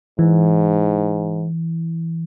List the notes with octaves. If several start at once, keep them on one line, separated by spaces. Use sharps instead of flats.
G#2 E3